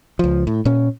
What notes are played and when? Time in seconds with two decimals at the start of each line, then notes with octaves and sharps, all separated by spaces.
0.19 C#2 F3
0.47 A2
0.65 A#2 C#4